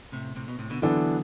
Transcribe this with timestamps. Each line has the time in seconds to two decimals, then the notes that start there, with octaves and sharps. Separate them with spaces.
0.12 A2 C3
0.35 A2 C3
0.48 B2
0.59 A2 C3
0.70 B2 D3
0.82 D3 E3 F#3 B3 D4 A4